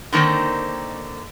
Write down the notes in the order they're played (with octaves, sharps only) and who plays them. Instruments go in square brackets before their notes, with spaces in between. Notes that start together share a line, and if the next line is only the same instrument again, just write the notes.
[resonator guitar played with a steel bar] D3 D#3 A#3 C4 D#4